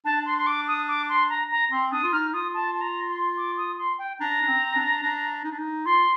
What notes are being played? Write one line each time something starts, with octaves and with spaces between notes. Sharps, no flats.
D4 A5
C6
C6
D6
D#6
D6
C6
A#5
A#5
C4 C6
D4 D#6
F4
D#4 F6
F4 D#6
A5
A5
A#5
C6
D6
D#6
C6
G5
D4 A#5
D4
C4
D4
D4
D#4
D4
D#4
F4 C6